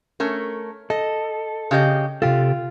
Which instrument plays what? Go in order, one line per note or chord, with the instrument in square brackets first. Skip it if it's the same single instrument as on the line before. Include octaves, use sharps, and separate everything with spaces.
[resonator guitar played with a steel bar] A3 C#4 A#4
[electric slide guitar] A4 [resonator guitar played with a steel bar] D#5
[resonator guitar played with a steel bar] C#3 G4 D#5
[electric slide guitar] C3 G4 A4 [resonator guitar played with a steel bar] F4